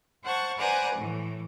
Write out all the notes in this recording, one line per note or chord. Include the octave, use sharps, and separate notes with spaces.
C5 F#5 A5 C#6
B4 C5 D5 F#5 G#5 A#5
A2 E3